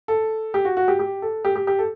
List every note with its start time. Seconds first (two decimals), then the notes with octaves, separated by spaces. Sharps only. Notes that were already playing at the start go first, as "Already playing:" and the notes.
0.08 A4
0.54 G4
0.65 F#4
0.77 F#4
0.88 G4
0.99 G4
1.22 A4
1.45 G4
1.56 G4
1.67 G4
1.79 A4